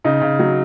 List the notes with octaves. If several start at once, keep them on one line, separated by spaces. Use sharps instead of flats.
C#3 D#4
C#3
F#3